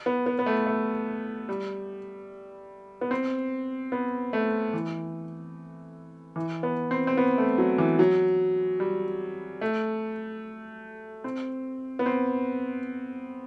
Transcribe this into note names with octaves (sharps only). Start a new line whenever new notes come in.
B3
B3
B3
A3
A3
G3
B3
C4
B3
A3
E3
E3
B3
C4
C4
B3
A3
F#3
E3
F#3
G3
A3
C4
B3
C4